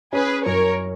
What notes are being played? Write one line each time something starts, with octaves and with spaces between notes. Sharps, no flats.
C#4 G#4 B4
F#2 A#4 C#5